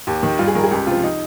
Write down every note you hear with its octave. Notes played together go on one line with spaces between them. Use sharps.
D#2 G4
D#3
G2 F4
G#4
D#3 A#4
G#4
C#2 G4
C3 F3 F4
D#4